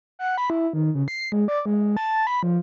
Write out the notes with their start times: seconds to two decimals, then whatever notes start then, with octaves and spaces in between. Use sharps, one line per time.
0.19 F#5
0.38 B5
0.50 E4
0.73 D#3
0.95 C#3
1.08 C7
1.32 G#3
1.48 D5
1.66 G#3
1.97 A5
2.27 B5
2.43 F3